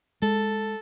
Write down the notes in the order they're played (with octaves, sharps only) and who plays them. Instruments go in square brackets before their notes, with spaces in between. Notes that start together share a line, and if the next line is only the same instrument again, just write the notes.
[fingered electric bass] G#3 [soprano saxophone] A4